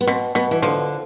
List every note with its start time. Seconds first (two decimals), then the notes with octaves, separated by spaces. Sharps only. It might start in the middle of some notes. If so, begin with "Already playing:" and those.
0.01 B3
0.07 B2 C4
0.35 B2 B3
0.51 E3
0.62 D3 F3